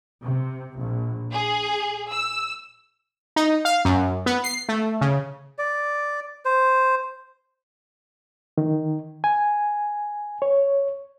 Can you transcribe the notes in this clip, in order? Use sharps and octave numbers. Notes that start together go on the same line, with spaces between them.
C3
A#1
G#4
E6
D#4
F5
F#2
B3
C7
A3
C#3
D5
C5
D#3
G#5
C#5